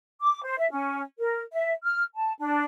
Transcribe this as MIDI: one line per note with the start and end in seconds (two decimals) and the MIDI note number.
0.20 0.43 86
0.44 0.56 72
0.58 0.69 76
0.70 1.03 61
1.18 1.41 70
1.52 1.71 76
1.83 2.03 89
2.15 2.33 81
2.38 2.65 62